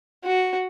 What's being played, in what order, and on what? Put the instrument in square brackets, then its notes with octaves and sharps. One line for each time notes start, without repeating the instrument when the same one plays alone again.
[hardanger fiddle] F#4